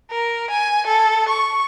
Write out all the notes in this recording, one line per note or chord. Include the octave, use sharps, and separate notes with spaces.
A#4
G#5
A4
C#6